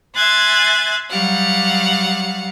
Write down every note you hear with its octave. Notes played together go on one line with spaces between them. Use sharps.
E5 G#5 C6 F#6 G#6 A6
F#3 G3 F5 F#5